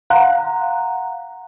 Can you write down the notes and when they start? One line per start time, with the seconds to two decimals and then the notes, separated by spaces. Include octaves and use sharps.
0.10 F5 F#5 A#5 C6 F#6